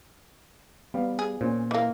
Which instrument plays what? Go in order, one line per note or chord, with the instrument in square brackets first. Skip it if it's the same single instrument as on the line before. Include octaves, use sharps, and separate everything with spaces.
[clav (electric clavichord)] G3 [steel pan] B3 F5
[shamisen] G#4
[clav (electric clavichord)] A#2 [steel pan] C#4 C5
[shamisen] E3 A#3 [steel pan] D#5 F5